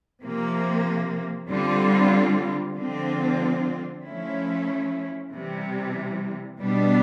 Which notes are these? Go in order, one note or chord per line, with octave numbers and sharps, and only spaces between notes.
C3 F3 A#3
D3 G3 C4 F4
D3 F3 G#3 C4 F4
F3 A3 C#4 E4
C3 E3 G3
B2 G3 B3 D4